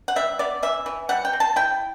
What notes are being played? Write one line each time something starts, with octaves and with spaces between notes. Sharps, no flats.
F#5
G3 E5
B3 D5
E3 E5
E3
G3 F#5
G5
C4
A5
E4 G5